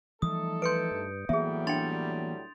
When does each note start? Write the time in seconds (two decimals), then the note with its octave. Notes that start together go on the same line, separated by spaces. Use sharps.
0.22 E3 F3 G3 A3 D#4 A4 D#6
0.62 B4 C6 G6 C#7 D7
0.91 G2
1.29 A2 E3 F#3 G3 A#3 B3 G#4 E5
1.67 D4 G5 C6 A6 F7